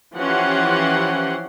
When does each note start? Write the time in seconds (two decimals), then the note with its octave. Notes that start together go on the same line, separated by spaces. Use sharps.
0.17 E3 F3 C#4 G4 F#5 C6